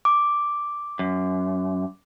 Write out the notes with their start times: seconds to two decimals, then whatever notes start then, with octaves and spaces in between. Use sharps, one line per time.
0.05 D6
0.99 F#2